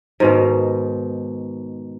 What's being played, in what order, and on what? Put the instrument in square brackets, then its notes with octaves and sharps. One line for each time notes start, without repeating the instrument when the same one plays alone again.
[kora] G#2 B2 D#3